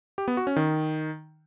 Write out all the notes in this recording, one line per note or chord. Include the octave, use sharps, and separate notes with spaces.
G4
B3
F#4
C#4
D#3